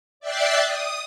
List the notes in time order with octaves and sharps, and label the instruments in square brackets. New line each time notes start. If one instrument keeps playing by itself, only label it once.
[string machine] D5 E5 G5 F#6 A6 C7
D#6